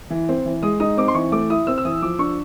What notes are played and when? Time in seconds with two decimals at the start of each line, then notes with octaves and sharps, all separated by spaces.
0.10 E3
0.29 C4
0.46 E3
0.63 G#3 D#6
0.80 D#4 D#6
0.97 C4 D6
1.08 C6
1.14 E3 C#6
1.32 A3 D6
1.50 E4 D#6
1.67 C4 E6
1.78 E6
1.85 E3 D#6
2.02 F3 D6
2.19 D4 C#6